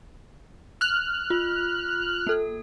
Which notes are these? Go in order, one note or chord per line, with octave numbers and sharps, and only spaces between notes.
F6 F#6
F4
A#3 A4